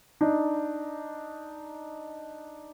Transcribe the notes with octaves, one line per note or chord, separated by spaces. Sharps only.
D4 D#4